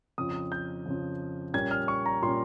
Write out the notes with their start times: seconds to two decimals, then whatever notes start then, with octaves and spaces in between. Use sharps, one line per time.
0.18 F2 C#3 F3 D#6
0.52 G6
0.86 F2 C#3 F3
1.54 A#2 G3 A#3 C#4 G#6
1.71 F6
1.88 C#6
2.06 A#5
2.22 A#2 G3 A#3 C#4 C6